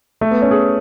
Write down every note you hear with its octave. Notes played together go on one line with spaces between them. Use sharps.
A3
B3
C#4
G#4